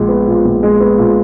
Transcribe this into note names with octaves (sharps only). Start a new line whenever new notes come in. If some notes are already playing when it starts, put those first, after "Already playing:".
Already playing: A#1 G#3
B3
A#2
A#1
G#3
B3
A#2